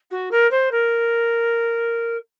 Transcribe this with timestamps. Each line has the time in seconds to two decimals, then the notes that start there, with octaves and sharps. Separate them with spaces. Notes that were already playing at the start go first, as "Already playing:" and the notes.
0.10 F#4
0.31 A#4
0.51 C5
0.71 A#4